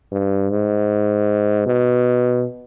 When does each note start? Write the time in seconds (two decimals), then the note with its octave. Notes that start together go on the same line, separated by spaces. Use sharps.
0.12 G2
0.50 G#2
1.66 B2